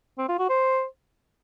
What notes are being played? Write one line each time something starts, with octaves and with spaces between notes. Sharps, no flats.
C4
F4
F#4
C5